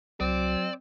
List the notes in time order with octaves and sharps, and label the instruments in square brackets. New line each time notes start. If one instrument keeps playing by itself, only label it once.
[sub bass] C2 [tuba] F#3 [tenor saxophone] C4 [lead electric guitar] D5